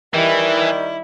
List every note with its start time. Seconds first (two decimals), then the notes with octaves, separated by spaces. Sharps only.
0.14 D#3 E3 G3 E4